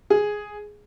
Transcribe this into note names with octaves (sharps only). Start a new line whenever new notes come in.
G#4